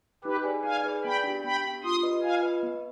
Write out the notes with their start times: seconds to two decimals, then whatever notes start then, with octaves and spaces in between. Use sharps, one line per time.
0.24 D#4 G4 B4
0.44 G#4 B4 D5 G#5
0.64 D#4 F5 G#5
0.84 G#4 B4 D5 G#5
1.04 B3 G5 B5
1.24 D4 G4
1.44 B3 G5 B5
1.64 D4 G4
1.84 F4 C6 D#6
2.03 B4 D#5
2.23 F4 F5 G#5
2.43 B4 D#5
2.63 B3